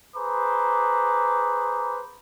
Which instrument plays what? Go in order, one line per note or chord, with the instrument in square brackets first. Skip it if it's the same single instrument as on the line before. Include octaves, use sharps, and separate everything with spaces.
[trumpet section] G#4 B4 C5 A#5 D6